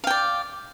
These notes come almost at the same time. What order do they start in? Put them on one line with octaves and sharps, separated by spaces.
F5 G5 D5